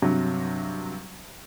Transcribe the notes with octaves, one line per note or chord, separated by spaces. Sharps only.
G2 C3 F#3